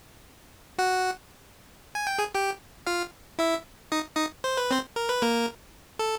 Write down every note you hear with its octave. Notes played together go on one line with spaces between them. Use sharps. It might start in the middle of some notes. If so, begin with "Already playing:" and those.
F#4 F#5
G#5
G5
G#4 G#5
G4 G5
F4 F5
E4 E5
D#4 D#5
D#4 D#5
C5
B4
C4 C5
A#4
B4
A#3 A#4
A4